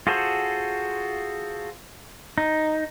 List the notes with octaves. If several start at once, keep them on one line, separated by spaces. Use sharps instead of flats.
F4 F#4 G#4 A4 C5
D#4